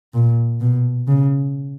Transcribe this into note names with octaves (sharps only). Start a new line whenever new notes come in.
A#2
B2
C#3